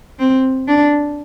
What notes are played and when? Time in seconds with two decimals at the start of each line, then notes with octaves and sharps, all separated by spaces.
0.19 C4
0.67 D4